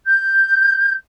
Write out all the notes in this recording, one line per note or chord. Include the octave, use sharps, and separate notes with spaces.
G6